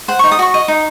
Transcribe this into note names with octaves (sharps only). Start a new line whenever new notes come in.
C5 F#5
D#4 C#6
D#6
F#4 C#6
D#5
D#4